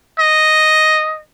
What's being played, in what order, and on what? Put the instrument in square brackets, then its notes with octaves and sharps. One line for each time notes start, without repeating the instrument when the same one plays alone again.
[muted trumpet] D#5